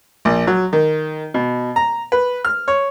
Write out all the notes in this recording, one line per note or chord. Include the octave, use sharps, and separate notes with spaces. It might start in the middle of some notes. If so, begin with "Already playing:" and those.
A#1
F#3
D#3
B2
A#5
B4
F6
C#5